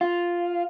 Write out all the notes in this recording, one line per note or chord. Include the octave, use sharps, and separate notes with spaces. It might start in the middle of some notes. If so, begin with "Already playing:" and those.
F4